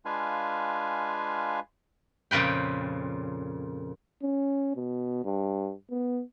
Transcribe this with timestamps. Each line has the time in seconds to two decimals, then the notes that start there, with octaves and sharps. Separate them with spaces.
0.05 G#3 D4 F4 B4 F5 G#5
2.31 F2 A#2 C#3 B4 G5
4.23 C#4
4.76 B2
5.24 G2
5.90 B3